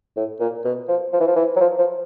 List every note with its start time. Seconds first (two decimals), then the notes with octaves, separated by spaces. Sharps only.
0.16 A2
0.40 A#2
0.65 B2
0.88 F3
1.13 F3
1.20 E3
1.27 F3
1.36 E3
1.56 F#3
1.60 F3
1.78 F3